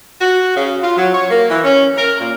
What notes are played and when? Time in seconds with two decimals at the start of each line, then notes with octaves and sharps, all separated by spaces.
0.21 F#4
0.56 C#3
0.82 F4
0.97 F#3
1.14 C#5
1.31 A#3
1.49 E3
1.64 C#4
1.97 A#4
2.19 A#2